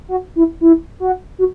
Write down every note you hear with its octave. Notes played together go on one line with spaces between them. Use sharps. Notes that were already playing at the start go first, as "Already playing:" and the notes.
F#4
E4
E4
F#4
F#4